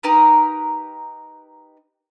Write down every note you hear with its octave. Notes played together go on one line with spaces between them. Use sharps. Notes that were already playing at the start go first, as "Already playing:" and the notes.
D#4 G4 A#4 B4